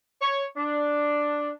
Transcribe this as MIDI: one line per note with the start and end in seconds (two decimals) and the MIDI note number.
0.22 0.44 73
0.57 1.50 62